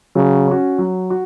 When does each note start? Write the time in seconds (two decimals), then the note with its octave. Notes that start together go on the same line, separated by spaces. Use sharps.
0.15 C#3 F#3
0.48 C#4 F#4
0.78 F#3
1.10 F#4